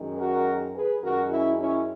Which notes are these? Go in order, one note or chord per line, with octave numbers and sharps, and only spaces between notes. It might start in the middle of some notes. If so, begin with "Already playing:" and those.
Already playing: F#2 D#3 G#3
F#4 A#4
G#4 B4
F#2 D#3 G#3 F#4 A#4
C#4 E4
C#4 E4